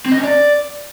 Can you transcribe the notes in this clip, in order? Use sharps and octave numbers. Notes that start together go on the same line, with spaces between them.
C4
D#5
C#4
D5